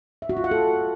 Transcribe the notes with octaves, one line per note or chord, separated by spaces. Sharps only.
E5
F#4
F4
F#5
A4